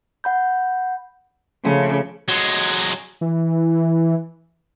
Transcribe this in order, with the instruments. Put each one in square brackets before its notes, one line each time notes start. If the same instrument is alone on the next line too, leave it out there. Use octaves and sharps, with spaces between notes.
[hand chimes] F#5 B5 G6
[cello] C#3 [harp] F3 A3 C#4
[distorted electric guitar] F#3 G#3
[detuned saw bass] E3